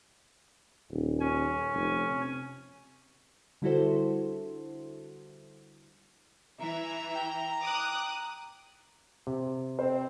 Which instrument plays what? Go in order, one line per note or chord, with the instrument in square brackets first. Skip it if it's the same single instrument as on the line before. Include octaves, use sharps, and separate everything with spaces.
[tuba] D#1
[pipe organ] C#4 G#5
[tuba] F1
C3
[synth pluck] D3 G3 E4 F#4 A4 C5
[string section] E3 E5 [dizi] A#5
[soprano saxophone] G5
[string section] D6 D#6 F#6
[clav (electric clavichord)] C3
[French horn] C4 [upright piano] C5